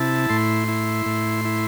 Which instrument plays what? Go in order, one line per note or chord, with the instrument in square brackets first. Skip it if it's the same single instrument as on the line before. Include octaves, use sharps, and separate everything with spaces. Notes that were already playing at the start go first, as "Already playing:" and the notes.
Already playing: [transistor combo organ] C3 E4 A5
A2 C6
E4
A2
E4